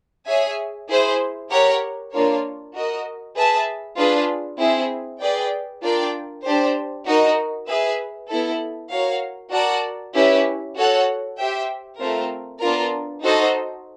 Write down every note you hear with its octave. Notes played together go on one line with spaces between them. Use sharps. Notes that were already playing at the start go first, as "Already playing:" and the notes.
G#4 C#5 E5 G#5
E4 G#4 C5
G4 A#4 C#5 F#5
A#3 D4 F4 A#4 C#5
F#4 A#4 D#5
G#4 B4 E5 A5
D4 F4 G#4 B4
C4 E4 G#4
G#4 B4 D5 G5
D4 F4 A#4 D5 G5
D4 G4 C5
D#4 F#4 A#4 D#5
G#4 B4 E5
B3 E4 A4
F#4 A#4 C#5 F5
F#4 A#4 D5 F#5 A5
C#4 E4 G4 B4
F#4 A4 C#5 F#5
G4 C5 E5 G5
A3 C4 F4 A#4
B3 D4 F4 A#4
D#4 F#4 A4 C5 D#5